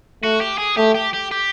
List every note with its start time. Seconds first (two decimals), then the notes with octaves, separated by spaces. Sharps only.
0.23 A3 F#4
0.41 G4
0.58 G#4
0.77 A3 G4
0.95 G4
1.13 G4
1.31 G4